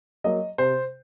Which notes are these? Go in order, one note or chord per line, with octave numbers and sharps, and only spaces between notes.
F#3 A#3 D#5
C3 C5